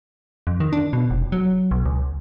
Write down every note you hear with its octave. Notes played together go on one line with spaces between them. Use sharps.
F2
D#3
D4
B2
F1
F#3
B1
C#2